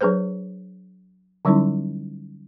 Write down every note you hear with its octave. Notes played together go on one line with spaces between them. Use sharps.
F#3 D4 G#4 B4 C5
D3 F#3 G3 C#4 D#4 E4